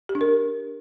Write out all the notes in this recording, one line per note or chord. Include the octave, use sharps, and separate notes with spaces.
G4
D4
A#4